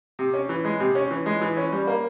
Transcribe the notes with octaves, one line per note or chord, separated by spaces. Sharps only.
C3
C#4
E3
G#3
C3
C#4
E3
G#3
E3
C#4
G3
A#3